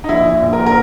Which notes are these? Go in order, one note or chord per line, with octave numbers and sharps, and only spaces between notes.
D#4
A#1 E4
A#2
A#1
A#4
A#2
A#4